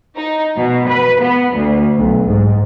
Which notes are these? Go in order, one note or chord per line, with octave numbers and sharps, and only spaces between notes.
D#4
B2
B4
B3
D2
B1
G#2